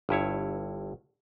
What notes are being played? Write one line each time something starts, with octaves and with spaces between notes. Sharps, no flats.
G1 G2 E4 C#5